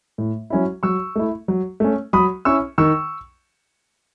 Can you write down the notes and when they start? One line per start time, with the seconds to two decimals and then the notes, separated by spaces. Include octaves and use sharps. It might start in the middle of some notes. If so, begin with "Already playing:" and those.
0.18 A2
0.50 F#3 C#4 E4
0.83 F#3 C#6 E6
1.16 A3 E4
1.48 F#3
1.80 A3 C#4
2.13 F#3 B5 D#6
2.45 C#4 E4 C#6 E6
2.78 D#3 C#6 E6